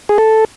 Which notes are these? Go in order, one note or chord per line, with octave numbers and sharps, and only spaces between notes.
G#4
A4